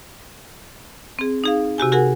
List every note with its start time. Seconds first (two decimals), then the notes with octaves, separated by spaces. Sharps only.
1.19 C4 G#4
1.44 D#4 G#4 F5
1.78 C3 F#4 G4 G#5
1.92 F#4 G#4 A#4 F#5 G#5